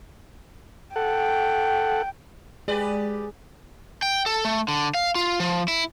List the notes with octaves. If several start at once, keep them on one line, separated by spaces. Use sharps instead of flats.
A4 F#5 G5
G#3 G4 G#4 B4 D5
G5
A4
A3
D3
F5
F4
F3
E4